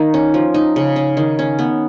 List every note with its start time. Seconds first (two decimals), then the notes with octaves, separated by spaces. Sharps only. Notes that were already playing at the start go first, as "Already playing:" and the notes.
Already playing: D#3 A#3
0.14 C#4
0.34 F3
0.54 D#4
0.76 C#3
0.96 C#4
1.17 D#3
1.39 C#4
1.59 B3